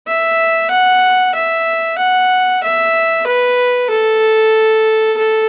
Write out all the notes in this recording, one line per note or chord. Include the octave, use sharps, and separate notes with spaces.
E5
F#5
E5
F#5
E5
B4
A4
A4